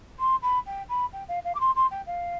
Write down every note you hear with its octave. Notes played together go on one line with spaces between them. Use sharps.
C6
B5
G5
B5
G5
F5
F5
D6
C6
C6
G5
F5